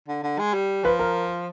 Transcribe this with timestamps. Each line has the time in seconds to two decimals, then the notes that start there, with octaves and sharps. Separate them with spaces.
0.08 D3
0.23 D3
0.39 G#3
0.54 G3
0.84 F3 B4
0.99 A#4